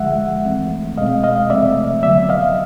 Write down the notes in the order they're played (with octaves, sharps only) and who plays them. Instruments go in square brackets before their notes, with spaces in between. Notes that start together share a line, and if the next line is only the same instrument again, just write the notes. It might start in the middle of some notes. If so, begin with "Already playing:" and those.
Already playing: [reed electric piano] D3 F3 G#3 E5 F#5
E3 A3 C4
B2 G#3 C4 D#5 F5
D#5 F5
C3 F3 A3 C4 D5 E5
D3 F#3 B3 D5 E5
D#5 F5